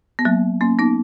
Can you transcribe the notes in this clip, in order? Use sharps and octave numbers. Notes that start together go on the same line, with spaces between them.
B3
F#3 A#3
A#3 C#4
B3 D#4